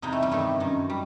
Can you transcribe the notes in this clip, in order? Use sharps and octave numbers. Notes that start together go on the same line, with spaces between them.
E2 C3 E3 D#4
A3
G3
G2 D#3 A3
F#2 D#3
G3